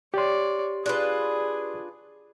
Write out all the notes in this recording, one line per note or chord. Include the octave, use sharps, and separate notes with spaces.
G4 C#5 D5 C6
D4 F4 G#4 B4